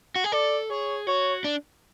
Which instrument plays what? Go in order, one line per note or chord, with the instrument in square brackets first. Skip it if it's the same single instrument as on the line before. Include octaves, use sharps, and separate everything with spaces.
[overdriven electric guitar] F#4
G#4
[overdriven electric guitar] A4 [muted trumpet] D5
[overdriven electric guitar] G#4 [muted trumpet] C#5
[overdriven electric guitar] F#4 [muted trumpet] C#5
[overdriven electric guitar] D4